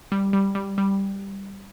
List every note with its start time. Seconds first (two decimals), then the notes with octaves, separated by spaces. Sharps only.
0.12 G3
0.33 G3
0.55 G3
0.78 G3